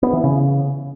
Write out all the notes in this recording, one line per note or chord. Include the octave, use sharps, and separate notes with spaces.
B3
E3
C#3